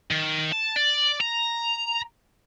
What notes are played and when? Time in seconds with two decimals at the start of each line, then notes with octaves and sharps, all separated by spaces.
0.11 D#3
0.52 A5
0.76 D5
1.21 A#5